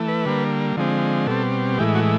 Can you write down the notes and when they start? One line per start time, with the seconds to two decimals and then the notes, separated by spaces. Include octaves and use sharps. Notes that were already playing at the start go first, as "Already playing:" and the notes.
Already playing: E3 A3
0.08 B4
0.25 D3 G3 A#3
0.76 D3 F3 G#3 C4
1.27 B2 G3 C4 A4
1.78 A2 E3 G#3 G4
1.95 F#4